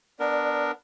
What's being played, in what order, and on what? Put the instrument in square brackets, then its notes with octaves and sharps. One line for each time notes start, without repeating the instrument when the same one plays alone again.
[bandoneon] B3 D4 A#4 [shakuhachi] D5